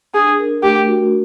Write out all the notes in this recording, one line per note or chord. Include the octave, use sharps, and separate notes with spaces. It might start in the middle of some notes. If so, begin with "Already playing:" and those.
D4 G#4
A#4
A3 G4
F#4